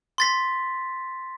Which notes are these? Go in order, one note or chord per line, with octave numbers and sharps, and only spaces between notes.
C6 A6 B6